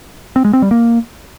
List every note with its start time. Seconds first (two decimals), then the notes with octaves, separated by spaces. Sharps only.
0.36 C4
0.45 G#3
0.53 C4
0.62 G3
0.71 A#3